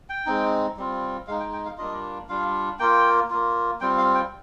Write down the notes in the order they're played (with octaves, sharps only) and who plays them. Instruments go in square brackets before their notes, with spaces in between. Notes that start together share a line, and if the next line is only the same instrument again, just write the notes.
[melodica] G5
G#3 C4 D#4
G3 C4 F4
G#3 F5
D#4
G5
G5
F5
G3 A#3 D4 F4 D#5
G3 D4 F4 F5
A#3 F4 G5
A#3 F4
G3 C4 F4 G5
F5
G5